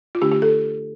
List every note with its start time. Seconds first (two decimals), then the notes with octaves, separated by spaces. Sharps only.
0.15 F4
0.21 D3 A3 D4 G4
0.31 G4
0.42 A4